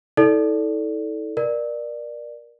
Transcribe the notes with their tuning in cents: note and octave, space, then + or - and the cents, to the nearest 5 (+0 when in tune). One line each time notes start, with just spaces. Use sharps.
E4 -45 A4 -5 D5 -15
A#4 +25 D5 +15